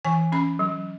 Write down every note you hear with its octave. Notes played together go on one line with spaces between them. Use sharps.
E3 G#5
C#4 B5
F#3